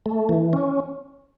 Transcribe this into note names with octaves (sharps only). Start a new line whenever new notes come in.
A3
E3
C#4